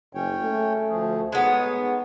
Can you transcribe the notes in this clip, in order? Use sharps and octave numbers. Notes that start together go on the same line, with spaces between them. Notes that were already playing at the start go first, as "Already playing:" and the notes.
F#1 C#4 C#5 G5
A3
D2 F3 G#4
G#3 B3 D#4 C#5